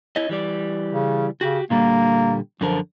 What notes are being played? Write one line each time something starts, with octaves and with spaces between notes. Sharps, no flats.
E4 C#5 D#5
E3 G3 D5
C#3
C#3 F#4 G4
A#2 D3 G3 A#3
F#2 D3 F3 A#4